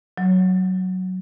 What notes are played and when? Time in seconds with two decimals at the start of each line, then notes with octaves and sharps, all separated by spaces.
0.18 F#3